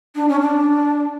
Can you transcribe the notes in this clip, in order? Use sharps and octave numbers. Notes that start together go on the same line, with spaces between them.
D4
C#4
D4